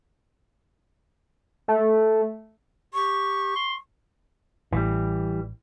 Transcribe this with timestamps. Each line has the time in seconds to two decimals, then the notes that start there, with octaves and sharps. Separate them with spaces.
1.68 A3
2.93 G4 C#6
3.56 C6
4.73 A1 A2 E3 G3